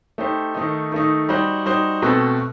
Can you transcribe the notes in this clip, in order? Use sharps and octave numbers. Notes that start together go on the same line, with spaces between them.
A3 D#4 G4 C5
D#3 A3 D#4
D#3 A3 D#4
G3 D#4 F#4 C5
G3 D#4 F#4 C5
B2 A3 C4 F#4 A4